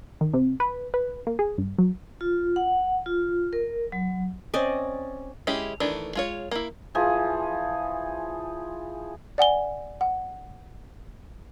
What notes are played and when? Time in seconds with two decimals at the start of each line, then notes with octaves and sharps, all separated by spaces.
0.21 D#3
0.34 C3
0.60 B4
0.94 B4
1.27 A#3
1.39 G#4
1.58 G2
1.78 F#3
2.21 F4
2.56 F#5
3.06 F4
3.53 A#4
3.92 F#3
4.54 C4 C#4 D5 D#5
5.47 G#3 C#4 E4 G4
5.80 D#3 E3 A3 D4
6.15 G#3 F4 C#5
6.51 A#3 E4
6.95 E3 F3 G#4
9.38 D5 F#5 G#5 G7
10.01 F#5